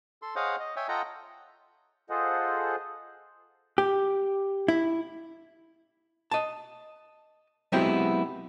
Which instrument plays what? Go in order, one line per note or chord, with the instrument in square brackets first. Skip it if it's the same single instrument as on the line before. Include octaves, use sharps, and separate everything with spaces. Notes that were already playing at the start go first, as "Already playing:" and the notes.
[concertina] A4 C6
G#4 C5 C#5 D#5 F5 F#5
D#5
C#5 E5 G5 G#5
F4 A4 D#5 F#5 G5 A#5
[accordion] F4 G#4 A4 C5 D#5 F#5
[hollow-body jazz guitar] G4
E4
D#5 A5
F#3 G#3 B3 C4 E4 G4